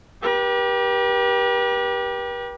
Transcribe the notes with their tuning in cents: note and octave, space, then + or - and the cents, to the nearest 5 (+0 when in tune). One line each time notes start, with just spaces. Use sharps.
G4 +0 B4 -45